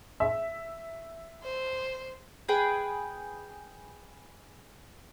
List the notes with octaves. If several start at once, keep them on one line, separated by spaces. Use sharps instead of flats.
E5
C5
G#4 B4 G5